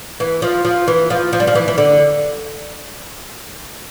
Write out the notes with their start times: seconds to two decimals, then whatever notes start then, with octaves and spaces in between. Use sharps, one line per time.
0.20 E3
0.42 F3
0.65 F3
0.88 E3
1.10 F3
1.33 F3
1.40 G3
1.47 F3
1.55 E3
1.68 E3
1.78 D3